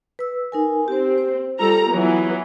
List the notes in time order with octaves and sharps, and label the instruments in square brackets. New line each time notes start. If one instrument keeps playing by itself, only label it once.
[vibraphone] B4 E6
D#4 A#4 G#5
[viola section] C4 [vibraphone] G4 C5
[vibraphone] C5
[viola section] G3 A4 A#5 [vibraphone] F4
[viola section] E3 F#3 B3